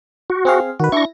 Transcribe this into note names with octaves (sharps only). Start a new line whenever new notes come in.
F#4
C4 G#4 F5
D#3 F#4 B4
D4 E4 C#6 A#6